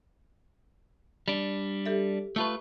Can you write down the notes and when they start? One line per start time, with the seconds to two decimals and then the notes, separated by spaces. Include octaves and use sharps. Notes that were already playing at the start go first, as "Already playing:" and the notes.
1.28 G3 D4
1.86 G4 A4 E5
2.36 A3 F4 B4 E5 A5 C#6